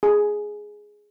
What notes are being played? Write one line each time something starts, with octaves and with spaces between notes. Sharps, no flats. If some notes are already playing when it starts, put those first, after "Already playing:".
G#4